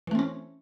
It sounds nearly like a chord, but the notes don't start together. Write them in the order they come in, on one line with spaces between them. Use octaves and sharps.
E3 A3 C4 C#4